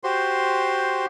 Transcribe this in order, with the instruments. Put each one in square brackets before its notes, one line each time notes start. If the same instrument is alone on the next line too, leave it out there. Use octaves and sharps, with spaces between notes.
[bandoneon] F#4 G4 C5 C6